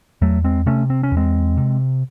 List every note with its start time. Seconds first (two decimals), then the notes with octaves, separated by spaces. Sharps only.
0.22 E2 F#3 A3
0.44 G#3 C4
0.66 C3 A3 C#4
0.90 C4
1.03 C#4
1.12 E2
1.17 G#3 C4
1.57 C3